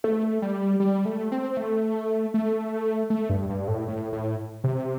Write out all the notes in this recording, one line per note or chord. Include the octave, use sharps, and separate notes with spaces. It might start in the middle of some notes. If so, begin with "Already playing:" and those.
A3
G3
G3
A3
C4
A3
A3
A3
G2
G2
A2
A2
A2
C3